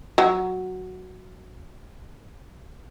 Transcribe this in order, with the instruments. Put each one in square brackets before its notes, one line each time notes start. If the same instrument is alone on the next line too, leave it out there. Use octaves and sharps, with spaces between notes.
[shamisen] F#3 F#4